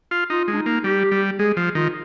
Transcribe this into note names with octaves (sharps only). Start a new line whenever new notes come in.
F4
D#4 F4
G#3 D4
D#4
A#3
G3 G4
G3
G#3 G#4
F3
D#3 F4